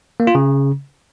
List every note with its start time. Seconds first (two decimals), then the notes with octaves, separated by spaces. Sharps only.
0.20 A#3
0.27 F4
0.35 C#3